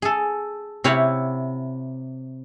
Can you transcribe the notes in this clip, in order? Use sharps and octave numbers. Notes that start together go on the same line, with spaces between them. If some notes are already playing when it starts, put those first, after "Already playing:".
G#4 A4
C3 E4 C#5 F5 F#5